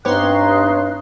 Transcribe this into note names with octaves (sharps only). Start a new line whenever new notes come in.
G2 B3 C4 D#4 G4 C#5 C6 F#6